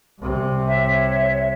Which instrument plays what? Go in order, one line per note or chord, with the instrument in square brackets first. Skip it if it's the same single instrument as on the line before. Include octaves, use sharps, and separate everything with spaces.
[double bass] C2 C3
[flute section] C#5 E5